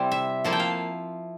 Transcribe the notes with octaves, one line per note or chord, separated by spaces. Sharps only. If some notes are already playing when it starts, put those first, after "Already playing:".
Already playing: C3 G3 C4 E4
E5
F3 A#3 E4 A5
G5
F5